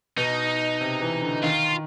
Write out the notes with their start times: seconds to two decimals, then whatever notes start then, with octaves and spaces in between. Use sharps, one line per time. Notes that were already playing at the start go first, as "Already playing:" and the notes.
0.18 B2 D#4
0.81 C3
1.01 E3
1.22 D3
1.43 D#3 F4